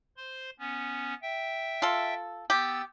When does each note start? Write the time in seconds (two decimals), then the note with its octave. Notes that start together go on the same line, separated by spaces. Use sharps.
0.17 C5 C6
0.59 B3 C#4
1.22 E5 G5
1.82 F4 A4
2.50 B3 G4 E6 A6